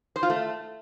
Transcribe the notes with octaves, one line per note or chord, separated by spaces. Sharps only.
C5
F4
A3